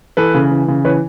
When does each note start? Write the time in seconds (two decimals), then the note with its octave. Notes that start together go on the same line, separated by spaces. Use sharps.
0.17 E3 A4 B4
0.34 C#3
0.51 E3
0.68 C#3
0.85 E3 B4 C#5